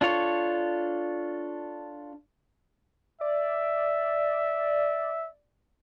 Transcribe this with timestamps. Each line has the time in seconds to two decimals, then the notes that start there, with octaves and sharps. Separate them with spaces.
0.01 D4 F4 A4 C#5
3.21 D5 E5